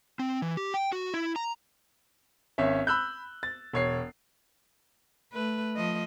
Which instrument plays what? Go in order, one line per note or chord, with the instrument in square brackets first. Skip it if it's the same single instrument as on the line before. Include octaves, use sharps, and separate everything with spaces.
[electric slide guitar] C4
E3
G4
G5
F#4
E4
A#5
[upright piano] G#1 C#4 C#5 E5
B5 E6 F#6 G6
A6
E1 C#5 C7
[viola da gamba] A3 B4
F3 D#5